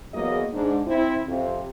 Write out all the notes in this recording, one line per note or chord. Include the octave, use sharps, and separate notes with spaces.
E2 F#3 A#3 G#4 D#5
G#2 D4
C4 E4
F2 C3